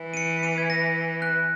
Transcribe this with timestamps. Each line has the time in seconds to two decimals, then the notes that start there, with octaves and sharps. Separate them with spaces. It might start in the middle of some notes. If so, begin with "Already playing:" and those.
Already playing: E3
0.14 D#7
0.17 C#7
0.43 D#7
0.58 G#6
0.70 A#6
1.22 F#6